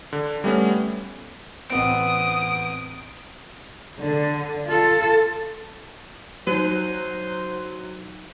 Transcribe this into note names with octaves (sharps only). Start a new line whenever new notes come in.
D3
G3 A3 B3 C#4
A1 B3 C4 D#6 D7
D3
F4 A4
F#3 D#4 C5 D#7